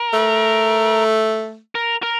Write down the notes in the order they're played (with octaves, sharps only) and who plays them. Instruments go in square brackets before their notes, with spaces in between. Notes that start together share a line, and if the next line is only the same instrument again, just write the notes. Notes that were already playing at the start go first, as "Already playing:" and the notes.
Already playing: [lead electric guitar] A#4
[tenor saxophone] A3
[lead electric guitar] A#4
A#4